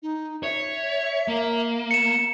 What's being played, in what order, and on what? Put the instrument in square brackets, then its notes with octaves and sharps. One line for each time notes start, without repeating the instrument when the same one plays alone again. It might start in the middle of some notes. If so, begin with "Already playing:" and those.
[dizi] D#4
[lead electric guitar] C#5 [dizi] E5
[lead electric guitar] A#3
[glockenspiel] C#7 E7